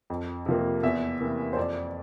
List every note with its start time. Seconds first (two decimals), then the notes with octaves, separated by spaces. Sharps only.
0.10 F2
0.46 C3 F3 A#3
0.83 E2 E5
1.20 C3 E3 A#3
1.53 C5
1.57 F2 D5